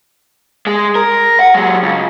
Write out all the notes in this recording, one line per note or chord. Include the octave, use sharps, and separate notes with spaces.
G#3
A#4
F#5
F#3 G#3
C#2